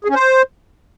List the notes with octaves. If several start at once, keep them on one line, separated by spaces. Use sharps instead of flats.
G#4
C#4
C5